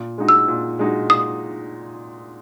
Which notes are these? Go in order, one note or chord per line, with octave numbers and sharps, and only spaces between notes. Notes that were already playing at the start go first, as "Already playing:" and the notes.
Already playing: A#2
G#3 D#4 F#4
E6
A#2
G#3 D#4 F#4
A#2 D#6